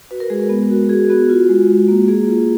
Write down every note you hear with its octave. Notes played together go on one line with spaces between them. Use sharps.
F#4 B4
A#4
G#3 G#4
A#4
B3
F#4
F#4 G#4
B3 F#4
F4
G#3
F#4
A#3
A#3 G#4
F4 G#4